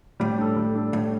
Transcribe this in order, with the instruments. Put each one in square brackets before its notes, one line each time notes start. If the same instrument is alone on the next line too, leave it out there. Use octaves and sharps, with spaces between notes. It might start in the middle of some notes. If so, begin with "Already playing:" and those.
[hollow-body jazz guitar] A2 [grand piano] G3
[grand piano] D4 A4
G3
D4 A4
[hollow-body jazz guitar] A2 [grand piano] G3